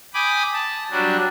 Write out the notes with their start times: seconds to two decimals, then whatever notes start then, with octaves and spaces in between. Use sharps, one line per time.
0.14 G5 G#5 B5 D6 D#6
0.53 A5
0.91 F#3 G3 D4 F#4